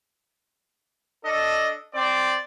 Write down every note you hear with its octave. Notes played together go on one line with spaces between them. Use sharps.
D4 A4 D#5
C4 D5